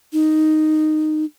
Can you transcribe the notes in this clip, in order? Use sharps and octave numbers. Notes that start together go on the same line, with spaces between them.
D#4